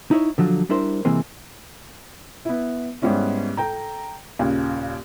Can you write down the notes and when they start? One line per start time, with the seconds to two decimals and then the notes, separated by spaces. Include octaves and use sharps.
0.11 D#4 E4 C#5
0.38 D3 F3 F#3
0.69 G3 D4 E4 A#4 C5
1.05 C3 E3 G#3 A#3 C4
2.45 B3 E4
3.02 G#2 G3 B3 C#4 E4
3.57 A4 G5 A#5
4.39 D#2 A#2 C#3